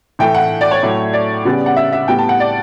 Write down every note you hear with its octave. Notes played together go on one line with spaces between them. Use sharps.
A2 E3 A3 G5
F#5
D5
C#5
A2 F#3 A3
D5
C#3 G3 B3
F#5
E5
E5
A2 G3 B3 G5
A5
F#5
D5